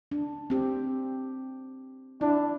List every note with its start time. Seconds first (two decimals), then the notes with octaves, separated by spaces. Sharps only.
0.11 D4
0.50 C4 G4
2.21 D4 E4